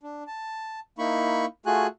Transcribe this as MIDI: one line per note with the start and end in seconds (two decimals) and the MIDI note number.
0.03 0.23 62
0.27 0.80 81
0.98 1.45 58
0.98 1.45 63
0.98 1.45 64
0.98 1.45 83
0.98 1.45 85
1.66 1.87 57
1.66 1.87 65
1.66 1.87 66
1.66 1.87 68
1.66 1.87 80
1.66 1.87 90